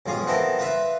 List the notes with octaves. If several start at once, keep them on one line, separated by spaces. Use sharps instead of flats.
B1 F2 F4 G#4
B3 C4 E4 A4 A#4
F4 B4 E5